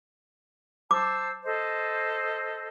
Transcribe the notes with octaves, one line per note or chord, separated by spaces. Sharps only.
C5 A5 D6 E6
A4 C5 D#5